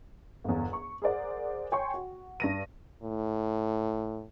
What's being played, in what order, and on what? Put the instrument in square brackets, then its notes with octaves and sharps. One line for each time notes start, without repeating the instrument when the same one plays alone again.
[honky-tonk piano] G1 E2
C#6
G#4 A#4 C5 D5 F#5
C#5 G5 G#5 C6 C#6
F#4
G2 A#6 D#7
[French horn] A2